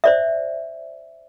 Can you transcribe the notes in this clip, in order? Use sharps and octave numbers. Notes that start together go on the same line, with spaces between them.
C5 D5 E5